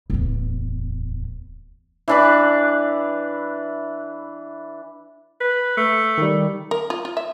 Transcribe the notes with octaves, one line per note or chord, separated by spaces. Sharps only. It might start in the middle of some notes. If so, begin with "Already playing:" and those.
D1 E2
E3 D4 B4
B4
A3
D#3 G3
A#4
F4
F4
E5